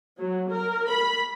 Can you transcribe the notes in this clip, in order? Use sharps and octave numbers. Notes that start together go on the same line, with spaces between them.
F#3
A#4
B5